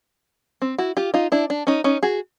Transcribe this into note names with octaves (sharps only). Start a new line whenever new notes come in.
C4
E4 F#4
F4 G4
D#4 F4
D4 E4
D4
C#4 D#4
C#4 D#4
F#4 G#4